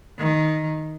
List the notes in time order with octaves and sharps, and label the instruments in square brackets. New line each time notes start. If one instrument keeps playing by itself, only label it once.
[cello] D#3